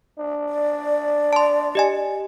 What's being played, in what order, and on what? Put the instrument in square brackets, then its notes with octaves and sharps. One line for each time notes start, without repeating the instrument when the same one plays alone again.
[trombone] D4
[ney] D5
[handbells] A5 C6
G4 D#5 G#5